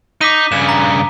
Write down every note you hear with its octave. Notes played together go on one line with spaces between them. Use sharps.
D#4 D6 B6 D#7
G2 C#3 E7
A#5